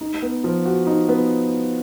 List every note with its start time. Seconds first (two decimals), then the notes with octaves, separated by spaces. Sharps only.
0.01 D#4
0.22 B3
0.44 F3
0.66 F#4
0.87 D#4
1.09 B3